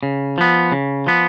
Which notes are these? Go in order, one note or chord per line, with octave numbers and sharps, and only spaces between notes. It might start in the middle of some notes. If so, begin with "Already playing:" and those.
C#3
F3 B3
C#3
F3 B3